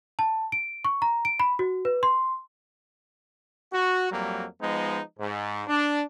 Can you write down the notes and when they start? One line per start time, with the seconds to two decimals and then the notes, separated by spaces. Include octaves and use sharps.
0.19 A5
0.52 D7
0.85 C#6
1.02 A#5
1.25 D7
1.40 B5
1.59 F#4
1.85 B4
2.03 C6
3.72 F#4
4.11 F2 F#3 G3 A#3
4.61 F3 G#3 B3 D#4
5.19 G#2
5.68 D4